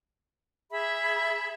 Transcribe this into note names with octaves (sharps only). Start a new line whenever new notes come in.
G#4 E5 B5